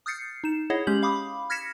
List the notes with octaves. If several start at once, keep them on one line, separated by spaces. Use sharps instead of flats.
D#6 F6 G6 A6 C7 C#7
D#4 E7
E4 G#4 C#5 D#5 F#5
G#3 C#4 G4 G6 F#7
F5 B5 D6 D#6
F6 G#6 A#6 B6 C#7 E7